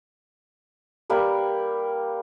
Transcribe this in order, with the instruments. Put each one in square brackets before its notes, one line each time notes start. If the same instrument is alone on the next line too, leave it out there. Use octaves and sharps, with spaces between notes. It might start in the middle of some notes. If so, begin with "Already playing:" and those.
[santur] G3 A#3 A#4 B4